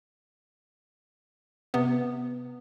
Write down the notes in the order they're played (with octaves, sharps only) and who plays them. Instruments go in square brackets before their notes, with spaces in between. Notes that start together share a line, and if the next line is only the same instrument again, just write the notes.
[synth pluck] C3 B3